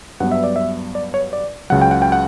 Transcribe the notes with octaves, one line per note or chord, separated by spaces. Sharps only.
G2 F#3 B3 D4 F#5
E5
D5
E5
D5
C#5
D5
C#2 C#3 F#3 F#5
G5
F#5
G5
F#5